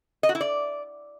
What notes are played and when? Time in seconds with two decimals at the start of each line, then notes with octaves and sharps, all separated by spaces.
0.23 D#5
0.29 F#4
0.35 E4
0.41 D5